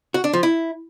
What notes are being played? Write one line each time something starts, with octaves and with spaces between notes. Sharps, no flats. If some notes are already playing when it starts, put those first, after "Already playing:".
F#4
D4
F3
E4